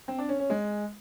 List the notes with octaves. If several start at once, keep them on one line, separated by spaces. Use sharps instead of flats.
C4
D4
C#4
C#4
G#3